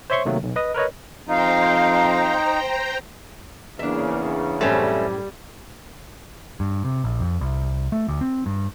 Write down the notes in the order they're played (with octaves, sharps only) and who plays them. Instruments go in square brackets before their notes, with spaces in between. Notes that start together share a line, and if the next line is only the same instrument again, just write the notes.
[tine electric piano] C5 C#5 E5 C6 C#6
C3 D#3 F#3 A3 A#3
B1
B4 D#5 D#6
A#4 B4 C#5 D#5
[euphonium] F2 [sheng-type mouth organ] D#4 [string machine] C5 G5 A#5 [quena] F5
[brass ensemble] E2 C#3 [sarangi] A#3 [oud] D4 E5
[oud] F#2 A2 C5 [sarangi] G3 [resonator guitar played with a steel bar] A3 C4 C#4
[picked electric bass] G2
C3
A#1
F2
C2
A3
D2
C4
G2